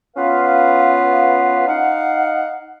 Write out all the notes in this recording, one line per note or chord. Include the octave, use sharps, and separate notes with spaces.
B3 C#4 F4 B4 F5
D#4 F5 F#5